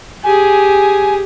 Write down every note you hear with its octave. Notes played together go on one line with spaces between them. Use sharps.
G4 G#4 G#5